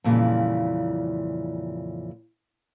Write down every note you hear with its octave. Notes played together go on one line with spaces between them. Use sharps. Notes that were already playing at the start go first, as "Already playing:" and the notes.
F2 A#2 C#3 E3 G3